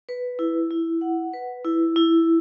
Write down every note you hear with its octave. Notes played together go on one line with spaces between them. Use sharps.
B4
E4
E4
F#5
B4
E4
E4